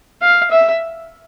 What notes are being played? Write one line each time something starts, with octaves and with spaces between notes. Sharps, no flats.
F5
E5